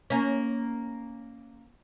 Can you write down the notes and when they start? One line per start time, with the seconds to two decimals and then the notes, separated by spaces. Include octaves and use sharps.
0.10 A#3 C#4